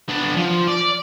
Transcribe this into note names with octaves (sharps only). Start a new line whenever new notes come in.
B3 D4
F3
D5